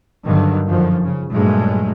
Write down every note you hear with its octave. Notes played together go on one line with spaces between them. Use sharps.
G2 D3 D#3 F#3
F#2 D3 D#3 F3
C#3
G2 A#2 F#3 G#3 A3